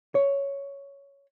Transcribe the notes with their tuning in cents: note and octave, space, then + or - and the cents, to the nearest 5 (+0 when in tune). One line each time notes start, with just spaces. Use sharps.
C#5 +5